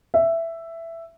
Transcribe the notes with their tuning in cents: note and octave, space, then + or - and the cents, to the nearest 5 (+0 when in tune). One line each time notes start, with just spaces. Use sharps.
E5 +10